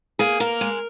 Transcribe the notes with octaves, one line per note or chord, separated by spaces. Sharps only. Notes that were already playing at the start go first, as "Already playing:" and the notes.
A#3 G#4
A#3 A#4
G#3